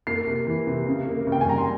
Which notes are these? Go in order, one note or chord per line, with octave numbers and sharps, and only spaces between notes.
A#3 C7
C3
E3
C3
C#3
A#3
C#3
G5
G#5
G3 A#5
C6